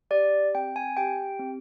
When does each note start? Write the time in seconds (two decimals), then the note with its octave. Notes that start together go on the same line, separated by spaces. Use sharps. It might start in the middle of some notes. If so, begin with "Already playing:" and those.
0.11 G4 D5
0.55 C4 G5
0.76 G#5
0.97 G4 G5
1.39 C4